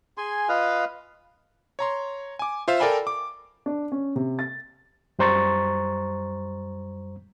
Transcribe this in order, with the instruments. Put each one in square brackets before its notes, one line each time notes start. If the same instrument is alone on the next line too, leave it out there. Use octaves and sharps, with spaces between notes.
[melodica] G#4 G#5 C6
F4 B4 D#5 F5
[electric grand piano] C#5 A#5 C6
G#5 D6
F4 C5 E5 F5
A4 A#4 D5 G5 G#5 B5
D6
[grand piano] D4
C#4
C3
A6
[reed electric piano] F#2 G3 C5 A#5 C#6 A6